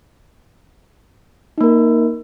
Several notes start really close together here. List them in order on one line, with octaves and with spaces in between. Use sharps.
D#4 A#3 A#4